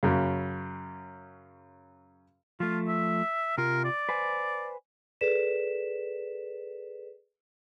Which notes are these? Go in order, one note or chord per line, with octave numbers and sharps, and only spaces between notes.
F#2 C#3
F3 A3 F4
E5
C3 F4 A#4
D5
B4 C5 G#5
G#4 A4 B4 D5 B6 E7